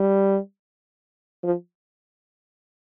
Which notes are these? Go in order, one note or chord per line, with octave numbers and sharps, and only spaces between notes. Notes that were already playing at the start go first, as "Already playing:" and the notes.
Already playing: G3
F3